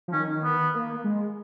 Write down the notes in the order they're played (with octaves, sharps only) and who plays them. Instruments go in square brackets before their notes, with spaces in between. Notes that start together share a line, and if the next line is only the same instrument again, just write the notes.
[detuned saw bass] F3
[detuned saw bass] D#3 [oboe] C#4
[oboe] B3
[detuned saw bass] A#3
G#3